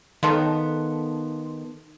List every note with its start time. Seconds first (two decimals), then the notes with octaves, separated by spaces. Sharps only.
0.23 D#3 B3 D#4 A4 F5 C6